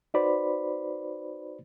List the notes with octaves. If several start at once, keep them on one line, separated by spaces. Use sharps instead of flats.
D#4 F#4 B4 C5 D5 B5